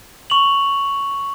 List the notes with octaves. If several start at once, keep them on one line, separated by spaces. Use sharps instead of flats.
C#6 F7 F#7